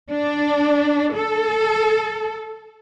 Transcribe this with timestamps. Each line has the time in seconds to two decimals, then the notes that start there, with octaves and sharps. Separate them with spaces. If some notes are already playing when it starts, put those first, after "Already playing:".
0.11 D4
1.16 A4